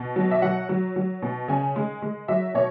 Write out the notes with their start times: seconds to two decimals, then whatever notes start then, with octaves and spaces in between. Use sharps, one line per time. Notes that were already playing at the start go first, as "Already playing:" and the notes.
Already playing: B2
0.16 F#3
0.31 E5
0.42 F#3 F#5
0.69 F#3
0.96 F#3
1.22 B2
1.48 C#3 G#5
1.76 G#3
2.02 G#3
2.28 F#3 E5
2.54 B2 C#5